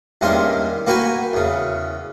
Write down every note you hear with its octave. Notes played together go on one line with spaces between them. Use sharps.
E2 G2 D#3 A#3 C#4 C6
A#3 F#4 B4 G5 G#5
E2 C#3